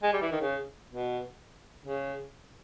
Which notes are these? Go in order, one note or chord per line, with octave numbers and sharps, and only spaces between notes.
G#3
G3
E3
D#3
C#3
B2
C#3